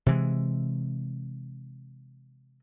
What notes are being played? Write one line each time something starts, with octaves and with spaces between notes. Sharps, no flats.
C3 E3 G#3